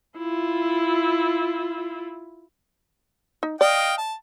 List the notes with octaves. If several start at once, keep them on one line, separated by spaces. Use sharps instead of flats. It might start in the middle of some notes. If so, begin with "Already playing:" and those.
E4 F4
D#4
D5 D#5 F5 G5
A5